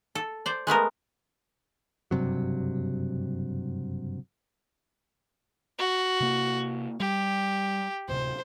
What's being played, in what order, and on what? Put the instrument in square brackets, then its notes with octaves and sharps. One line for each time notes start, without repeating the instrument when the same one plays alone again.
[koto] A4
C5 D5
G#3 A3 B3 A#4
[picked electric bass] F#1 G2 C3 F#3
[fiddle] F#4
[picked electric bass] C3 A#3
[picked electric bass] G3 [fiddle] G4
[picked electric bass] D1 C3 [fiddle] C5